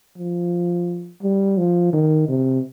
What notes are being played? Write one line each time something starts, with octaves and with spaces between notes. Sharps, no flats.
F3
G3
F3
D#3
C3